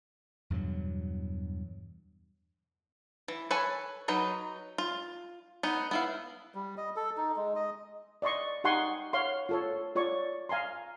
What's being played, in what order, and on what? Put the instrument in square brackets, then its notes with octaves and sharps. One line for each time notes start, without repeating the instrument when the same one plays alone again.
[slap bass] E2 G2 B2 F#3
[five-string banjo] E3
A4 B4 C#5 G#5
F#3 D#4 B4
F4
B3 D#4
B3 E4 F5
[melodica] G3
D#5
A4
D#4
G#3
D#5
[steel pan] D5 D#5 C6 C#6
D#4 G4 F#5 G#5 C6 C#6
C#5 F5 F#5 C6
F4 A4 C#5
F4 C#5 D5 C#6
F5 G#5 A#5 C6